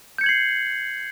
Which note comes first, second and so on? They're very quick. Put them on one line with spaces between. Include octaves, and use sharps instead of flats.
G6 C#7 G#6 F#7 C7